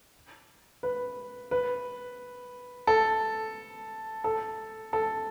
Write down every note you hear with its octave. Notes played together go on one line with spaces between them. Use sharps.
B4
B4
A4
A4
A4